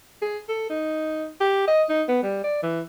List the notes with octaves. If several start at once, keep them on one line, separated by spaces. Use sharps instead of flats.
G#4
A4
D#4
G4
D#5
D#4
B3
G3
D5
E3